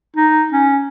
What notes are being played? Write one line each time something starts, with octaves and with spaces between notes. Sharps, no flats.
D#4
C#4